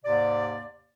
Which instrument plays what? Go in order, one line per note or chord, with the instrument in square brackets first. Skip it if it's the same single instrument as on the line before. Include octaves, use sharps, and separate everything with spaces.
[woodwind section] D#2 G#2 C3 D5